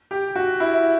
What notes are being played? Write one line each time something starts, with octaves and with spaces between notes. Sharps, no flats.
G4
F#4
E4